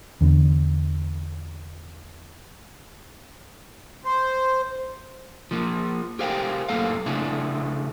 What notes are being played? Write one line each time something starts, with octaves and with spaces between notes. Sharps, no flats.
E2 D3
C5
F3 A#3
G4 A#4 C5 F5 G5
F#2 A2 A#3 A4 F5
C#3 A3 D4 E4